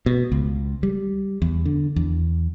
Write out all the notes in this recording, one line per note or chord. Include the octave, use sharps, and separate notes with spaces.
B2
C#2
G3
E2
D3
E2